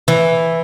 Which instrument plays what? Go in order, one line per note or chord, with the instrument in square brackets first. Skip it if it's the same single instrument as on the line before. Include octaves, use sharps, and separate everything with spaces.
[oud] E3